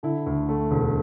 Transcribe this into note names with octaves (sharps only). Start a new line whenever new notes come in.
D3 E4
D2
A3
E1